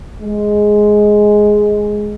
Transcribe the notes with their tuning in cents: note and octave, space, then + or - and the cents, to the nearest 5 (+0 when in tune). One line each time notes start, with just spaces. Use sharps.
G#3 +5